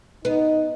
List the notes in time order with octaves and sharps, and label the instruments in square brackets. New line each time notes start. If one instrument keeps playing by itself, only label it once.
[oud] B3 [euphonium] D#4